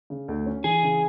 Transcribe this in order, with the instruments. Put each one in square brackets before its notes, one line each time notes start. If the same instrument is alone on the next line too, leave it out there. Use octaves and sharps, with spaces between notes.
[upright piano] C#3
D2
C#4
[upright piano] E3 [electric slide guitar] G#4
[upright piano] C#3